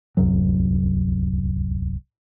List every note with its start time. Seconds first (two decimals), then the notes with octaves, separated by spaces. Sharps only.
0.17 D1 C2 F#2 F#3